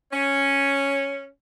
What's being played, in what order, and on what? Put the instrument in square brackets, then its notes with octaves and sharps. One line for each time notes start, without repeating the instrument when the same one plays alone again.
[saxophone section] C#4